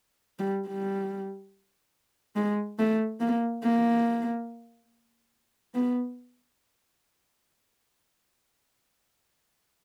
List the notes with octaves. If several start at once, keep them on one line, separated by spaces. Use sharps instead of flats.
G3
G3
G#3
A3
A#3
A#3
B3